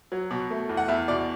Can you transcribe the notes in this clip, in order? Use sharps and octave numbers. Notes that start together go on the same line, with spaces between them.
F#3
B2
A3
E2
F#5
E2 E5
B2 D5